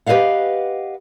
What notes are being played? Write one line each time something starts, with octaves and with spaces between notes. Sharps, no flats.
G4 B4 C5 D#5 F5 F#5